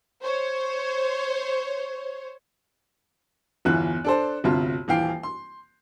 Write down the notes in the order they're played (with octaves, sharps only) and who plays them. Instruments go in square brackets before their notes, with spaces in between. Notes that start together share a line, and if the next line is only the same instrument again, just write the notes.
[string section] C5 C#5
[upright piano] G1 E2 E3 F4 F#6
D4 A4 C5
G1 D2 C3 F4 A5
D#1 E3 F5 G5 C7
C6